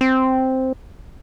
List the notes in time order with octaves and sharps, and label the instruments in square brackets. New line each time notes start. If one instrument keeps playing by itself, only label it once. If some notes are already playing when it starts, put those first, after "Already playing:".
[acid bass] C4